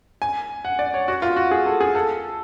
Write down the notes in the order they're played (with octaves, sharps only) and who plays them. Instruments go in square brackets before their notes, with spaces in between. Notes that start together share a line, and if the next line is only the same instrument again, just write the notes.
[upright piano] G#5
F#5
D5
C#5
F#4
F4
F#4
G#4
A4
G#4
A4